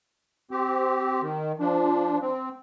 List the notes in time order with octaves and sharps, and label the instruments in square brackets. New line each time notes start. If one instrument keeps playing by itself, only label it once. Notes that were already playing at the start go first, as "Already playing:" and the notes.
[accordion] C4 G4
D#3
F3 D4
C4